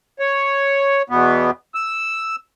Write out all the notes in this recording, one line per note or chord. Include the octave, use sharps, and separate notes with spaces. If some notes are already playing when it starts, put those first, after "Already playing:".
C#5
E2 B2 B3
E6